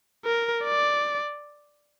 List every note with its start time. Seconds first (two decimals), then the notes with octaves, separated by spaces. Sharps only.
0.25 A#4
0.64 D5